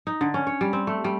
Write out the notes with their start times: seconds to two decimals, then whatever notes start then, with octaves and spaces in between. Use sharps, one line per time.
0.07 D#4
0.21 D3
0.34 C#4
0.47 C#5
0.61 G3
0.73 C4
0.87 A3
1.04 G3